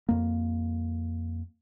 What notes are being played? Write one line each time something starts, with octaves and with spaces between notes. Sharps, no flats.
F2 A#3